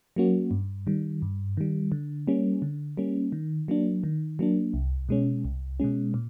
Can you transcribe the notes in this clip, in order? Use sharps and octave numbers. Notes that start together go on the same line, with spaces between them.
F#3 A#3 C#4 F#4
G2
D#3 G3
G2
D#3 G3
D3
G3 A#3 C#4
D3
G3 A#3 C#4
D#3
F#3 A#3 D4
D#3
F#3 A#3 D4
C2
B2 G#3 C#4
C2
B2 G#3 C#4
A#2